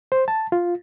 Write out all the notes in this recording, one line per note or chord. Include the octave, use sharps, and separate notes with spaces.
C5
A5
F4